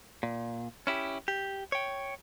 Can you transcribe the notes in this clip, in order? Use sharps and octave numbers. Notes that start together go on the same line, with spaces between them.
A#2
C#4 E4 G4
G4
C#5 G5